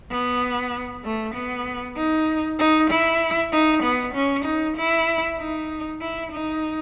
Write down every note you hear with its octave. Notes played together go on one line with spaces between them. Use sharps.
B3
A3
B3
D#4
D#4
E4
D#4
B3
C#4
D#4
E4
D#4
E4
D#4